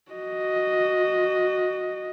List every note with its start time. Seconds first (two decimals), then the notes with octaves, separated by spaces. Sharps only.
0.11 F#4 D#5